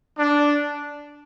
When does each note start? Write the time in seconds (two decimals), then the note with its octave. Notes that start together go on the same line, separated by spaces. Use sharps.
0.18 D4